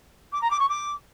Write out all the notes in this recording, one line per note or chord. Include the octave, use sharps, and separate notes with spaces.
D6
A#5
D6
C#6
D6